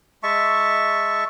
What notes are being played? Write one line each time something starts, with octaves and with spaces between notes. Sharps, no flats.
G#3 E5 A5 C#6